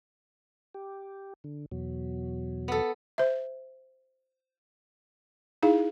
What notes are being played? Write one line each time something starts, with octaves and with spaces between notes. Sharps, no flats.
G4
D3
E2 B2 F#3
B3 A4
C5 E5
D#4 E4 G#4 F5